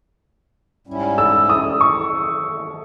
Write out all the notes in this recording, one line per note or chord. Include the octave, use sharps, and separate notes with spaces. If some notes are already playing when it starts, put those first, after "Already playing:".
G#2 G3 C#4 E4
E6
D#6
C#6